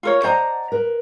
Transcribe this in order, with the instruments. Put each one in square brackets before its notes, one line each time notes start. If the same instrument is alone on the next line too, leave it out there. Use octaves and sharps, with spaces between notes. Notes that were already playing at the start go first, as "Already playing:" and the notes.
[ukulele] F4 A#4 C#5
[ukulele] C5 D#5 A#5 [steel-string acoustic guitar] D5 F#5 A5
[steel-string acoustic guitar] A#4 B4